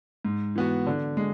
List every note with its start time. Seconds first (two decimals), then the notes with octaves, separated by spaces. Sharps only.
0.25 G#2
0.56 E3 B3 F#4
0.87 D3
1.17 G#3